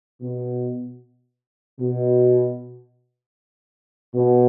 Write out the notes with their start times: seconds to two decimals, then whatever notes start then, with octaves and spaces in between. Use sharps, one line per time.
0.22 B2
1.79 B2
4.14 B2